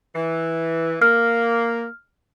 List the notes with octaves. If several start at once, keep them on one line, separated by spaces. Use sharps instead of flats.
E3
A#3 F6